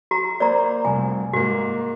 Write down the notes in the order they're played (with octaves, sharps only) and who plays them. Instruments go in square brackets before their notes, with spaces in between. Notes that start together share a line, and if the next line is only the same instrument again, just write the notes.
[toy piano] F#4 A#5
[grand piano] A#3 C5 [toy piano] D5 A#5
[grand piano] F1 C2 [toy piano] G#5
[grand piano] G#2 A#3 [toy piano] F#4